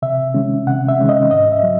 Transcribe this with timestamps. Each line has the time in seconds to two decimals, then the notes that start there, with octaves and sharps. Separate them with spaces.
0.02 C3 E5
0.34 D#3 G#3 C#4
0.67 C3 F#5
0.89 E5
0.99 D#3 G#3 C#4
1.09 D#5
1.31 G#2 D#5
1.52 E5
1.63 F#3